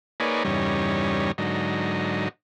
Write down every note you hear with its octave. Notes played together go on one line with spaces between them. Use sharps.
A#3 D#4 G#4 B4 C#5 D5
E2 G2 C#3 G3 D#4 C#5
G#2 D3 F#3 D#4